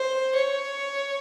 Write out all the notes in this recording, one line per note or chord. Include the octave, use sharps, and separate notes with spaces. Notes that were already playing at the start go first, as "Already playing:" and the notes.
Already playing: C5
C#5